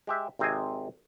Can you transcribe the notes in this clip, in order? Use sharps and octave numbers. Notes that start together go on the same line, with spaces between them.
G#3 G4 E5
G#1 C3 C4 C5 D#5 G#5